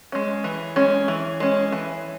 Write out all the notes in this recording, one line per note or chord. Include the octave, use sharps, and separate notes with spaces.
G#3 C#4
E3
G#3 C#4
E3
G#3 C#4
E3